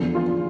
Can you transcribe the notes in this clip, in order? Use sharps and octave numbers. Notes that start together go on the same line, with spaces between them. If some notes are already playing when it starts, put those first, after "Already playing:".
Already playing: E2 D3 F3
F4